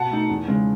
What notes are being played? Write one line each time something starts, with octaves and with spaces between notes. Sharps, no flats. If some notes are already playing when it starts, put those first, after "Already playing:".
Already playing: B2 F#5 A5
A3 D#4
E2
C#3 G#3